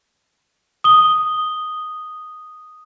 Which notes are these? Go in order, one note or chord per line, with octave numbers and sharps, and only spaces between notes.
D#6 G7